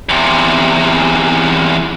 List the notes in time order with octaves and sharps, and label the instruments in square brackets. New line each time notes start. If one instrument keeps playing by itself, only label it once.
[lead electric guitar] E2 C3